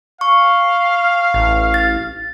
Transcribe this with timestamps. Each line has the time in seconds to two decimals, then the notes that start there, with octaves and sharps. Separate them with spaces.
0.21 F5 C#6
1.34 A1
1.74 A6